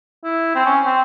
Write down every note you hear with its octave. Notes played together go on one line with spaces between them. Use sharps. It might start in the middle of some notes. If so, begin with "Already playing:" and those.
E4
C4
C#4
C4